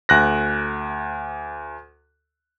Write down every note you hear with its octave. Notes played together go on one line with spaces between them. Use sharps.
D2 F#6 A#6